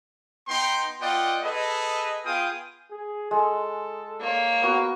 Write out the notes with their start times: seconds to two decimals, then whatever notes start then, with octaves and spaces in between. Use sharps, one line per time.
0.48 B3 D#4 G5 C6
1.01 B3 F4 D5 D#5 F#5 G5
1.42 G#4 A4 B4 D#5
2.25 B3 F4 G#4 F5 G5 D#6
2.91 G#4
3.31 G#3 A4
4.20 A#3 C#5
4.62 B3 F#4 A#4